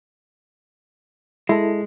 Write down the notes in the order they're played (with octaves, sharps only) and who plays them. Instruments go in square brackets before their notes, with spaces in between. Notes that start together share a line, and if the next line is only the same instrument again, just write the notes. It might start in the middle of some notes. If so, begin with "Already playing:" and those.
[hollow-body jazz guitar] G#3 [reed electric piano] E4 A4